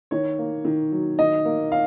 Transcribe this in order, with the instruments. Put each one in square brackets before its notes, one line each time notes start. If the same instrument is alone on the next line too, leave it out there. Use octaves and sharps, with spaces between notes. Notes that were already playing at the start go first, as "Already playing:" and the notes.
[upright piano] D#3 [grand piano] C#5
[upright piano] A#3
D#3
F#3
[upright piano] D#3 [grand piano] D#5
[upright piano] A#3
[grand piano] F5